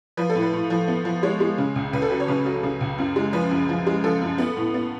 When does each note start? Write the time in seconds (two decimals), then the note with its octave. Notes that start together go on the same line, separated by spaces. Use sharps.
0.17 F3 B4
0.30 A4
0.35 A2
0.42 B4
0.53 A2
0.70 F3
0.88 B3
1.05 F3
1.23 G#3 C#5
1.40 G#3
1.58 C#3
1.76 C#2
1.93 C#2 B4
2.02 A4
2.11 F#3 B4
2.20 C#5
2.28 C#3 B4
2.46 F#3
2.63 C#3
2.81 C#2
2.98 F#2
3.16 G#3
3.33 F3 B4
3.51 F#2
3.69 F3
3.87 G#3
4.04 F3 A4
4.22 F#2
4.38 B3
4.57 A2
4.74 B3